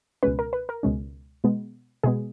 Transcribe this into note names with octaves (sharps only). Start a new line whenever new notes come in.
C#2 B2 G#3 C#4 B4
A#4
B4
A#4
C#2 B2 G#3 C#4
B2 G#3 B3
B2 G#3 B3 G#4